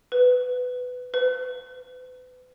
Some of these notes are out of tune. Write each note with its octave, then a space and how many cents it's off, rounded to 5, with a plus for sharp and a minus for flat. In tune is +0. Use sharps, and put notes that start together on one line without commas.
B4 +15
B4 +40